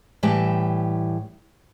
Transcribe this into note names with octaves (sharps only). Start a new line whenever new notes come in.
A2 E3 G3 G4 A5